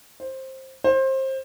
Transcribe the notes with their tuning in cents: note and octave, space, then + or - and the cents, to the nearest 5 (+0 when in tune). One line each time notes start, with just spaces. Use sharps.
C5 +15
C5 +25